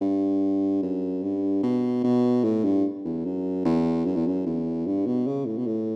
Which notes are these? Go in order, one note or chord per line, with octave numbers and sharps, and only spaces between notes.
G2
F#2
G2
B2
B2
A2
G2
E2
F#2
E2
F#2
E2
F#2
E2
G2
B2
C#3
A2
B2
A2